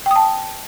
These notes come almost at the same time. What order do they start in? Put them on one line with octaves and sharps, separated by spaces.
G5 D#6 A5